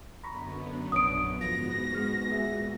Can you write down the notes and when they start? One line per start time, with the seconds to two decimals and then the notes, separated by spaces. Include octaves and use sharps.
0.24 F#2 D3 B3 A#5 B5 C#6
0.92 A#1 D4 C#5 D#6 D7
1.41 G#2 F3 B3 F4 F#4 A#6
1.93 G#3 F6
2.30 A#2 G#3 G#4 E5